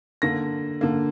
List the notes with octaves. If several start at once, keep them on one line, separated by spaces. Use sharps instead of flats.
D3 A#3 A#6
D3 A#3